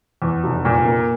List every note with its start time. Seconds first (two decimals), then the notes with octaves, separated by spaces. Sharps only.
0.22 E2
0.44 F1
0.65 A#2
0.85 A#3